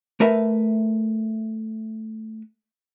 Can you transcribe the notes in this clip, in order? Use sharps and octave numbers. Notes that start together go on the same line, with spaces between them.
A3 A#4 B4 E5